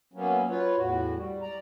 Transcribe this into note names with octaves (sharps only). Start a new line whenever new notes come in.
F#3 A#3 B3 C#4
F4 B4 C#5
E2 A2 F#4
G3
D5 A#5